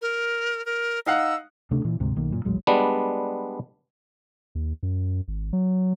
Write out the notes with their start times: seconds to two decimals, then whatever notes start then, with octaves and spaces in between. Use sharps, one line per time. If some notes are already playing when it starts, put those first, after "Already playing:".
0.02 A#4
0.66 A#4
1.06 D#4 F5 F#5 E6
1.71 D2 C3 A3 D4
1.85 A#2 E3
2.00 D2 G#2 C3
2.16 B1 D#3 A#3
2.30 F#2 A#2
2.45 D#1 A1 F#3 G#3
2.67 G3 G#3 B3 D4
4.55 D#2
4.83 F#2
5.28 G#1
5.53 F#3